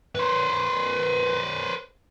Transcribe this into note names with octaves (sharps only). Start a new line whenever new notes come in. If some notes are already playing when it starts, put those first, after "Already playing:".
B4 C5